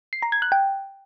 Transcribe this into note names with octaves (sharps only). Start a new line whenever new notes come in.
C7
A#5
G#6
F#6
G5